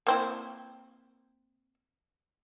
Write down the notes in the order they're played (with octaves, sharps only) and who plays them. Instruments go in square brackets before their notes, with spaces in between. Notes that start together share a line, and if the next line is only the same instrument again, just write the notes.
[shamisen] A#3 C4 E4